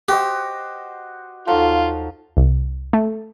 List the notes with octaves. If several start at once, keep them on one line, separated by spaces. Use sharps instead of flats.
F#4 G4 C5 D#5
D#2 F3 F#3 D#4 F4 A4
C2
A3